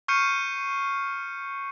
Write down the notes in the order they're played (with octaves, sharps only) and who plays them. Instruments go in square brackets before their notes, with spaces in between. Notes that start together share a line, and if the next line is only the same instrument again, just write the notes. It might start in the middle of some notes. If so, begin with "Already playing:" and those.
[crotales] C#6 F6 G6 C7 C#7 D#7